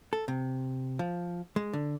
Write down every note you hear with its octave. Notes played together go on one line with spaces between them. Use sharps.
A4
C3
F3
G#3
D3